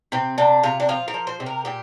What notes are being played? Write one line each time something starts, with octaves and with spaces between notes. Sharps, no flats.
C3 C4
C3 D4
C3 F4
D4
F3 F4
A#4
F3
C5
C3
A#4
A#2 G4